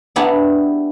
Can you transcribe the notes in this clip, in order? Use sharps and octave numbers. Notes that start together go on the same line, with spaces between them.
B3 D4 E4 G4 G#4